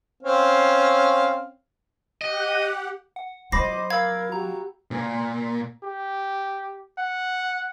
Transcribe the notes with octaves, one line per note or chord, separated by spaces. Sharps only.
C4 C#4 F5
G4 D#5 F#5
F#5
F#3 C5 D#5 B5 D6 A#6 C7
A#4 F5 B5 E6 G#6
F#4 G4 A#5
A#2
G4
F#5